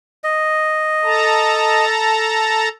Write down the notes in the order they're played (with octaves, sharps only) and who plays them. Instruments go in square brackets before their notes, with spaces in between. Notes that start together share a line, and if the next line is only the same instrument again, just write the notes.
[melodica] D#5
[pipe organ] A4 A5 A#5